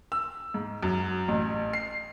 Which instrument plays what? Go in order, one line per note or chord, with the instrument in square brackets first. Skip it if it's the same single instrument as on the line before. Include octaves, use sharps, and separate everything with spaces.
[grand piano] E6
G#2
F#2
A1
C7